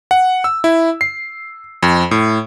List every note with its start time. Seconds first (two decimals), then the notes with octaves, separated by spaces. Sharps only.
0.11 F#5
0.44 E6
0.64 E4
1.01 C7
1.83 F2
2.11 A2